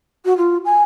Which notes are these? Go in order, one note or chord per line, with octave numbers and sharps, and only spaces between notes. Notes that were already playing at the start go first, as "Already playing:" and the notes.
F#4
F4
G#5